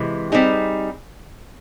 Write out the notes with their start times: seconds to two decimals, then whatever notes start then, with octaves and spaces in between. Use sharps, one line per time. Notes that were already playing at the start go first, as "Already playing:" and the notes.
Already playing: C3 E3 G#3
0.32 G3 C4 D#4 G#4